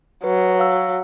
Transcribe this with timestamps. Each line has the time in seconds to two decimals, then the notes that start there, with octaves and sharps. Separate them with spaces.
0.24 F#3 B4
0.59 F5 E6